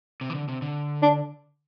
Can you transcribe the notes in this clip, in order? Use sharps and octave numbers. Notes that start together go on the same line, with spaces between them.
C3
E3
D3
C3
D3
D4